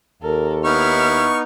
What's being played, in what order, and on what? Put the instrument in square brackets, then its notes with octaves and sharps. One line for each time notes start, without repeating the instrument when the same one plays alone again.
[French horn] D#2 [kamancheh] A4 A#4
[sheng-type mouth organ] B3 D#4 [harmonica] E4 C#6 [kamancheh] F6